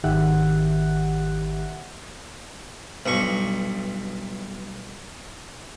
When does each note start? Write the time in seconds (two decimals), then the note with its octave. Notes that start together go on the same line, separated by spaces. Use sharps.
0.04 G#1 D#3 G4 E5 F#5 F#6
3.06 B1 G2 C#6